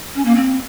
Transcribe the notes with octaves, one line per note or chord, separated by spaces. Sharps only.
C#4
A#3
C4